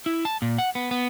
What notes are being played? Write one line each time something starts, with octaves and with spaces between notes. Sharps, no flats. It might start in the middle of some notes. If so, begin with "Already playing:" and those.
E4
A5
A#2
F#5
B3
B3